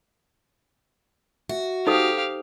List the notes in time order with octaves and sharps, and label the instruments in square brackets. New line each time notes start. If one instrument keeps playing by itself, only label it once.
[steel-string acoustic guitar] F#4 [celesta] E5
[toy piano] D#4 A4 D#6 [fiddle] G4 F5 [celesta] C5